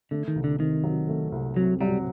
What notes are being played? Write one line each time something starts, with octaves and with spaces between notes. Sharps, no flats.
D3 A3
D#3
C2
D3
C3 D#3
F#3
A3
C2
C3 F#3
F#3 G3